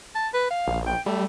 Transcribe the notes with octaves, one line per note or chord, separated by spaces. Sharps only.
A5
B4
F5
A#1
G5
G3 A3